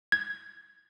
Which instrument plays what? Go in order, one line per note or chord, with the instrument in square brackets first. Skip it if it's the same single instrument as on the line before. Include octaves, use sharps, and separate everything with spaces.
[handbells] G#6